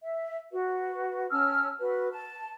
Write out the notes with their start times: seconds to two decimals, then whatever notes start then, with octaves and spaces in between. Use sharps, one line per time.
0.02 E5
0.52 F#4 B4
1.31 C#4 A5 E6 F6
1.80 F#4 B4
2.12 A5